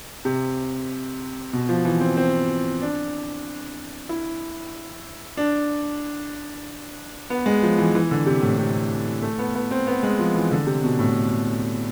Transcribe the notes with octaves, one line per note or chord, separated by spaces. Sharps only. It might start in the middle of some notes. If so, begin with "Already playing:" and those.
C3
B2
F3
E3
C4
C4
D4
E4
D4
B3
G#3
F3
E3
E3
D3
C3
A2
C3
A3
B3
B3
C4
B3
G#3
F3
E3
D3
C3
B2
A2